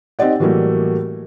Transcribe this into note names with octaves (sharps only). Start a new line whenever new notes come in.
C4 D#4 G4 D5 F#5
A2 E3 F#3 G3 A3 A#3